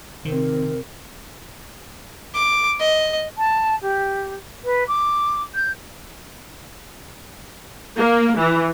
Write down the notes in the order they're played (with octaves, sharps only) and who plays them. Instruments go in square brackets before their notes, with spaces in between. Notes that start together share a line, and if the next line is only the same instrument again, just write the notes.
[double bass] C3 C4 [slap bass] D#3 [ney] A#4
[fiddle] D6
D#5
[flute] A5
G4
B4
D6
G6
[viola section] A#3
E3